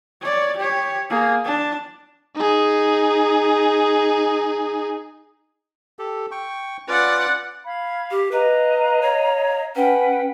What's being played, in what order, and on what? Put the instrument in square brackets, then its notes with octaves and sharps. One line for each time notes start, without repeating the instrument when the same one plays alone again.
[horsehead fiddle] C#5 D5
G4 C#5
A#3 G#4
D4 A5
[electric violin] D#4 G#4
[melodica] G4 A4
G5 C#6
[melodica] C#4 F4 B4 [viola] D5 F#5
[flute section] F5 B5 G#6
[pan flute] G4
[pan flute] B4 [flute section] D#5 F5 A#5
[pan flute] C#5
[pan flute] C#4 [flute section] B4 F#5 G5